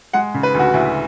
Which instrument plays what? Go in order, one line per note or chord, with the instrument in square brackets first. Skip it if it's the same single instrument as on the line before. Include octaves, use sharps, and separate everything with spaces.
[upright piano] G#3 F#5
C#3
B4
D2 F#4
D2 E4